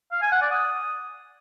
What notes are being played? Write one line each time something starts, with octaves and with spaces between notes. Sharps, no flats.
F5
G#5
F#5
D5
D#6